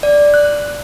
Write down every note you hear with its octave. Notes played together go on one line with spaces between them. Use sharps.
D5
F#6